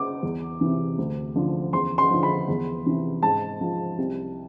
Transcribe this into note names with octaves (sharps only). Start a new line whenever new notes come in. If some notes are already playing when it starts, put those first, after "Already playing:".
Already playing: D6
E2
C3 E3
D2
D3 F3
E2 C6
C6
D3 F3
B5
E2
C3 E3
G#2 A5
F3
C2